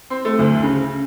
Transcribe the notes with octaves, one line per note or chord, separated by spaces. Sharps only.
C4
A3
D2
C#3